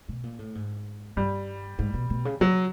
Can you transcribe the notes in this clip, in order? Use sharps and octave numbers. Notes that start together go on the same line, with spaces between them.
B2
A#2
A2
G#2
G2 G3
G#2
B2
B2
C#3
C#3 F#3